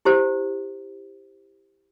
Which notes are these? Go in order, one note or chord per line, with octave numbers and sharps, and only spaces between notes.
E4 G4 C5